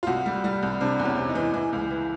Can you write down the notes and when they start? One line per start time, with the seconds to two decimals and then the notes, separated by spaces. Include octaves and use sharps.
0.03 F4
0.07 C2 F#4
0.26 G3
0.44 G3
0.62 C2
0.80 C3 D4
0.99 E2
1.05 C#4
1.17 C3
1.29 D#4
1.35 E3
1.54 E3 E4
1.73 C#2
1.91 E3